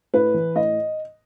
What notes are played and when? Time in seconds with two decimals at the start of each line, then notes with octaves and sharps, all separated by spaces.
0.14 A2 B4
0.34 E3
0.56 A2 D#5